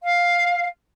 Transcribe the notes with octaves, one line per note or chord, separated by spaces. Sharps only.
F5